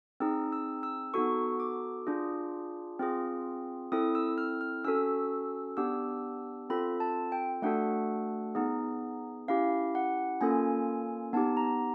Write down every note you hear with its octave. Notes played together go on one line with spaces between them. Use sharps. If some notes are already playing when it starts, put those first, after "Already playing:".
C4 D#4 G#4 E6
E6
E6
B3 D#4 F#4 A4 C#6
D6
D4 F4 G#4
C4 F4 G#4
C4 E4 A4 D#6
E6
F6
F6
C#4 F#4 A4 E6
B3 D4 G4 E6
C4 F4 A4 B5
A5
G5
A3 D4 F#4 A4 F#5
B3 D#4 G#4
C#4 E4 G4 F5
F#5
A#3 C#4 F4 A4 G#5
B3 D#4 G4 A5
A#5